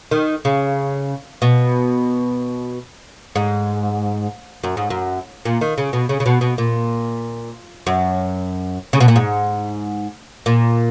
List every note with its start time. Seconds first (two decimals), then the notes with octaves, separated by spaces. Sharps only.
0.11 D#3
0.45 C#3
1.42 B2
3.36 G#2
4.64 F#2
4.77 G#2
4.90 F#2
5.45 A#2
5.61 D#3
5.78 C#3
5.93 B2
6.09 C#3
6.20 C#3
6.26 B2
6.41 B2
6.58 A#2
7.87 F#2
8.93 C#3
9.00 B2
9.08 A#2
9.16 G#2
10.46 A#2